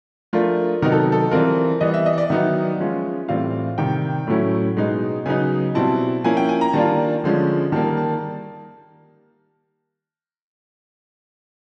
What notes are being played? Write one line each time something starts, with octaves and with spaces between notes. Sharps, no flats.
F3 A3 D4 F4 A#4
C3 D#3 F#3 B3 D#4 A#4
A4
A4
E3 G3 C4 F4 A#4
E3 G3 B3 D#5
E5
D#5
D5
D#3 F#3 B3 D#4 E5
F3 G#3 C#4 F4
A2 E3 G3 C4 F4 F5
C3 D#3 G3 G5
A2 F#3 A3 C#4 E4
B2 G#3 B3 D#4
C#3 F#3 B3 D#4 G#5
B2 G3 C4 E4 A5
F3 A#3 C#4 E4 G#5
G5
G#5
A#5
D#3 G3 A#3 D4 F4 A5
D3 F3 G#3 C#4
D#3 G3 A#3 A5
A5